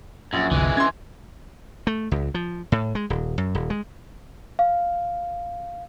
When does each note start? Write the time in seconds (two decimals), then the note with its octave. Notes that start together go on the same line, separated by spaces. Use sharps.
0.33 A#1 F#2
0.51 F#1 C2 D3 E3 G#3
0.77 C#4 C6 G#6
1.87 A3
2.11 C#2
2.34 F3
2.72 A2
2.95 G#3
3.10 D#1
3.38 F#2
3.55 D#1
3.70 G#3
4.59 F5